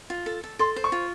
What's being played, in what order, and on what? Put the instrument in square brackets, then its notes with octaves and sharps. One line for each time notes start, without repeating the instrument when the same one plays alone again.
[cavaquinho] F4
A4
A4
[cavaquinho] A4 [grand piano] C6
[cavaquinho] C5
[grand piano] C#6
[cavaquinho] F4